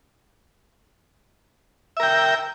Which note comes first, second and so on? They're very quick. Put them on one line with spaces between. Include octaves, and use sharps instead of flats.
E5 A#4 G5